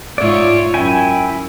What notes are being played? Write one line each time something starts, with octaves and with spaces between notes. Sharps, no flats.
G#2 F4 C#5 D5 E5
F#2 E4 G5 G#5